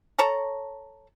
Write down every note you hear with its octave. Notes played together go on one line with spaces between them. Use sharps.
A4 C#5 A5 A#5